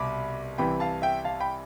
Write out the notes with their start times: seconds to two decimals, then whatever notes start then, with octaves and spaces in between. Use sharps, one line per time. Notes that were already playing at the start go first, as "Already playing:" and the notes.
Already playing: C2 B2 B5 D6
0.58 C2 C3 E3 G5 B5
0.80 F5 A5
1.02 E5 G5
1.24 F5 A5
1.40 G5 B5